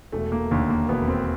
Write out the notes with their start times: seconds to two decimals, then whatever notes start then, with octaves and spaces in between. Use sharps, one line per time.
0.12 E1 A3
0.32 A#3
0.51 D#2 D3 A3
0.70 A#3
0.89 E1 B3
1.08 C4